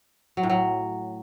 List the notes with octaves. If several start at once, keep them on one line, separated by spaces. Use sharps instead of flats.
F#3
A2
F#3